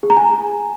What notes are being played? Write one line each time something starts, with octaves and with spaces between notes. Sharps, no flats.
G#4
A#5
G#5